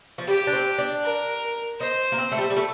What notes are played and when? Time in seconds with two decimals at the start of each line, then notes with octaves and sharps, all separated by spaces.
0.18 F3
0.27 G3 G4
0.47 D4
0.53 C4
0.78 D4
1.04 A#4
1.80 D#4 C5
2.12 A#3
2.18 C4
2.32 A3
2.38 G3
2.50 G3
2.57 A3